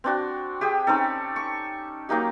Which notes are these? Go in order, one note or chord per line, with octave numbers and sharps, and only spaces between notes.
C4 D4 F#4
G4 G#4 G5
C4 C#4 D#4 A4
C#6
F#3 A#3 D#4 G4